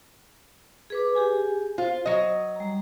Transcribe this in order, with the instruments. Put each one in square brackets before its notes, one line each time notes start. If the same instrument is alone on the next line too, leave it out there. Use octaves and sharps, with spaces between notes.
[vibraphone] G#4 B4 D6
G4 G#4 G#5
[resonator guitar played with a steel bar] F4 [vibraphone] C5
[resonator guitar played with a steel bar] F#3 D#5
[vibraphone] G3 A#5